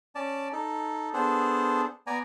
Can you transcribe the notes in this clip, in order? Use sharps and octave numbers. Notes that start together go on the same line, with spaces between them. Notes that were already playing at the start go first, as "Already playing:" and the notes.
C#4 D5 A5
D#4 A4
B3 D4 G#4 A4 C5
B3 D5 G#5 A#5